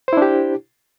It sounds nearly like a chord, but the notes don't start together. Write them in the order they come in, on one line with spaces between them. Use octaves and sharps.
C5 E4 D4 G4